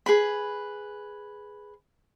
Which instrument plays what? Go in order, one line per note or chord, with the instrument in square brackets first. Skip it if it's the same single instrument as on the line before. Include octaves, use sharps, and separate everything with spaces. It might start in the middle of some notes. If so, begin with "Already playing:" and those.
[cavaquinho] G#4 B4 B5